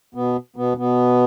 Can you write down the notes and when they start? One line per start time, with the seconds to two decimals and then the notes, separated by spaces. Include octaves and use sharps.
0.15 B2 B3
0.56 B2 B3
0.77 B2 B3